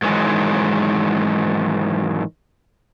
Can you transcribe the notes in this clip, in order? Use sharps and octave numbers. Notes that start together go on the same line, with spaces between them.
G#2 D#3 E3 F#3 G#3